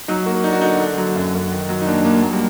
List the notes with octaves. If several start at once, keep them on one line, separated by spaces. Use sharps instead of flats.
F#3 D#4
A#3 F#4
D4 D#4
F#4
D3 D#4
D3
F#3
F#2
F#2
D#3
F#3
D#4
D#2 D4
D#2 A#3
F#3 A#3
G3